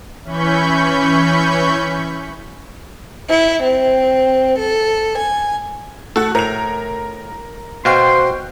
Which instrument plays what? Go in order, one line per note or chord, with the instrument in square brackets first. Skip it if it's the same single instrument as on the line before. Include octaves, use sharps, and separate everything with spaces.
[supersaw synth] E3 C#4 B5 C#6 G6
[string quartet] E4
C4
A4
G#5
[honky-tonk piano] A3 F#4 [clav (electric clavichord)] A4
[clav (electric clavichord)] A2 [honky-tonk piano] A#4 F7
[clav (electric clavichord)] B2 F5 [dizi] C5 [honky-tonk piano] G5 C#6 F#6 [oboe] C6